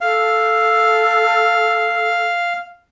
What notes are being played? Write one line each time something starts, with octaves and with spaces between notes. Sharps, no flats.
A4 F5